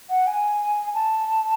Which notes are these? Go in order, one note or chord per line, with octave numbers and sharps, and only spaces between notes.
F#5
G#5
A5